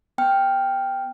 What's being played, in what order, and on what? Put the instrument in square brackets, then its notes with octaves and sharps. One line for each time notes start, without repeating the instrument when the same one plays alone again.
[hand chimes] B3 G5 F6